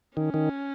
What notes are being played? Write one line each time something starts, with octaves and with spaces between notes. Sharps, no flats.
D#3 C#4
D#3